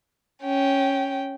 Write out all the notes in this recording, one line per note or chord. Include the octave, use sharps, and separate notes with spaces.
C#4 G5